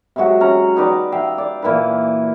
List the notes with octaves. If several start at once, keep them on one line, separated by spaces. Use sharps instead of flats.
C3 F#3 G#3 F#4
C#4 A#5
D#4 B4 D5 G5
E5 F5 G5
D5
A#2 E3 E4 B4